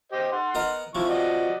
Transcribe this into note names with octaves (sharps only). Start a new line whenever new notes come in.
G4 C5 D#5
F#5 C6
B3 A#4 D#5
C3 F3 E4 C#6
F#4 D5 D#5